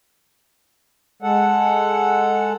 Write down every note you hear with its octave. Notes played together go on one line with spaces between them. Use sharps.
G#3 A4 F#5